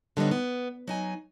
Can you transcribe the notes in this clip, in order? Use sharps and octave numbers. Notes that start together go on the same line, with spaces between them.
D3 G3 B3 D#4 C#5
B3
F#3 D#4 G#5